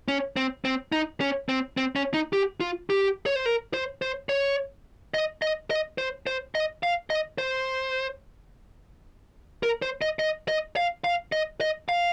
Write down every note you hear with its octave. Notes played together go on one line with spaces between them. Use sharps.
C#4
C4
C4
D#4
C#4
C4
C4
C#4
D#4
G4
F4
G4
C#5
C5
A#4
C5
C5
C#5
D#5
D#5
D#5
C5
C5
D#5
F5
D#5
C5
A#4
C5
D#5
D#5
D#5
F5
F5
D#5
D#5
F5